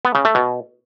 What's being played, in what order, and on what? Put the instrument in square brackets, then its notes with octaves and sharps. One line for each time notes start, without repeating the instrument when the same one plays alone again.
[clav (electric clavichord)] B3
C#3
A3
B2